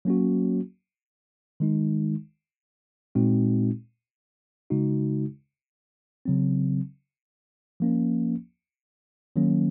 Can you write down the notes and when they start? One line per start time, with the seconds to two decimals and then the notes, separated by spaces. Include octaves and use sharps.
0.05 F#3 A#3 C#4 F#4
1.60 D#3 G#3 D#4
3.15 A#2 G#3 C4 D#4 F#4
4.70 C#3 G#3 D#4 F#4
6.25 C#3 F#3 C4
7.80 F3 A#3 C#4
9.36 D#3 F#3 A#3 C#4